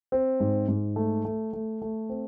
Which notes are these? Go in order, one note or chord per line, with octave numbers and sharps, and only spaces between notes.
C4
G#2
G#2
A3
A3
A3
A3
C4